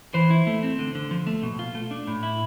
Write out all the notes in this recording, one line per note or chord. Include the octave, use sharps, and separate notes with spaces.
E3 C5
E4
A3
C4
D3
D3
F3
A3
B2
F4
A3
D4
A2
E4